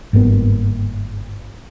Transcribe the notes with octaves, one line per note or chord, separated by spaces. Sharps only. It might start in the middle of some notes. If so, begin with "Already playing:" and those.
G1 G#2 A#3 B3